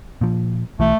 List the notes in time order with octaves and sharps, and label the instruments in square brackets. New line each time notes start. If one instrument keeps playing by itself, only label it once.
[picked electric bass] A#2 F3
[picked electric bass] B1 E3 [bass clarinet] A3